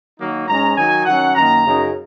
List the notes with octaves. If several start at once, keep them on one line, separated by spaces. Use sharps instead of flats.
D#3 F#3 A#3 D#4
G#2 G#3 C#4 A#5
D#3 F#3 D#4 G#5
D#3 F#3 C#4 F#5
F#2 D#3 A#3 A#5
F#2 C#3 F#3 D#4